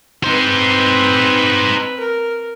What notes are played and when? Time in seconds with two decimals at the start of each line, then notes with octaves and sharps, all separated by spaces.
0.24 C4 D#4 B4 C5
2.00 A#4